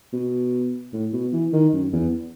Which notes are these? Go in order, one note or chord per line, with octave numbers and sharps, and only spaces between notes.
B2
A2
B2
E3
D#3
F#2
E2